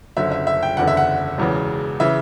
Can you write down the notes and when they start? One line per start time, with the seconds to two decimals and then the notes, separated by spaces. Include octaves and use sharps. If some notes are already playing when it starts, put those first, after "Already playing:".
0.17 F#1 F#2 D3 E5
0.32 E5
0.47 E5
0.63 G5
0.77 F#1 E2 D3 F#5
0.87 E5
0.97 F#5
1.38 E1 E2 C#3 E3
2.00 C#3 E3 E5